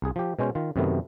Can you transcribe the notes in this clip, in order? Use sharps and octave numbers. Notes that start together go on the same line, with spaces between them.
C2 G#4
F3 G4
B2 G#3 C#4 C5
D#3 F4
F#2 C3 D#3 A3 B3